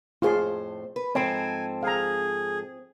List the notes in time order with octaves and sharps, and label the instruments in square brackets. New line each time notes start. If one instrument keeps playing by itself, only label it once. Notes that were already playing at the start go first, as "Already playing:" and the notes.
[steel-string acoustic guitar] F2 A2 C5 [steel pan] F4 G#4 C6
[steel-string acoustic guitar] B4
[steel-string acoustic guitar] G#2 F3 A4 [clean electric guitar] C4 [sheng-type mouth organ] G#5
[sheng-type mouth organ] G#4 [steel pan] F5 A#5